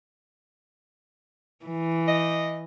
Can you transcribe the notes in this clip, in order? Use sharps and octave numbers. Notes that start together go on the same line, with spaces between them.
E3
D#5